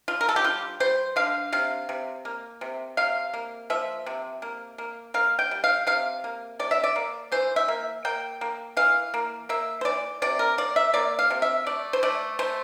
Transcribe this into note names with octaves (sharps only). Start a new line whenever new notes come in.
D3 F4
A#4
A4
G4
G3 F4
G3 C5
D3 F5
C3 F5
C3
A#3
C3
C3 F5
A#3
F3 E5
C3
A#3
A#3
A#3 F5
G5
G3
F5
C3 F5
A#3
C3 D5
E5
D5
A#3
E3 C5
E5
A#3
A#3 G5
A#3
E3 F5
A#3
A#3 E5
C5
E3 D5
C3 D5
A#4
A#3 D5
E5
A#3 D5
F5
C3
E5
A3 D5
C5
A3 D5
A3 C5